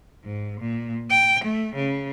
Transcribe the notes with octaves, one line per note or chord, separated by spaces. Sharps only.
G#2
A#2
G5
A3
C#3